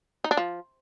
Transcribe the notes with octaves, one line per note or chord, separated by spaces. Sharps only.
D#4
D4
F3